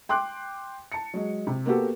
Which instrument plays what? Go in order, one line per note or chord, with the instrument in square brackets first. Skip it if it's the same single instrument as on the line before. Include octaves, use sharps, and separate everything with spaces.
[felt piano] G5 C6 D6 F#6
A5 C#7
F#3 G#3
C3
A#3 B3 F#4 G4 A4